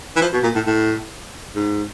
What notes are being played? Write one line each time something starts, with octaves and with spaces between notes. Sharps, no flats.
E3
F3
B2
A#2
A2
A2
G#2